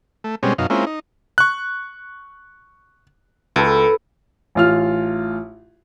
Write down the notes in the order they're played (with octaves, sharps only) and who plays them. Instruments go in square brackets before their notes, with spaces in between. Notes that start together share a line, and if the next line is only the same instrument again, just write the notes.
[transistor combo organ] A3
B2 G3 G#3 C4 C#4
F#2 B2 D#4 F5
G#3 A#3 C4 C#4 E4 F4
D#4
[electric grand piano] C#6 F#6
[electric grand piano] C#2 [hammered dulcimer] A4 B4
[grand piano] A1 F4 F6